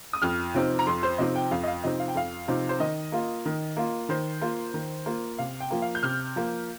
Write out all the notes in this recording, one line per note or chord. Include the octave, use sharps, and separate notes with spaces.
D#6
F2 F6
C3 F3 C4 D#4
A#5
F2 C6
C5
C3 F3 C4 D#4 D#5
G5
F2 F5
D#5
F5
C3 F3 C4 D#4 D#5
F5
G5
F2 F5
C3 F3 C4 D#4
C5
D#3 D#5
A#3 F4
D#3
A#3 F4
D#3 C5
A#3 F4
D#3
A#3 F4
C3 F5
G5
F3 A#3
F5
G6
C3 F6
F3 A#3